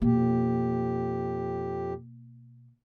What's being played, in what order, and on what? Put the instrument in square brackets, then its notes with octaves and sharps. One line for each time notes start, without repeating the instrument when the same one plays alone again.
[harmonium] F2 G4 [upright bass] B2 A#3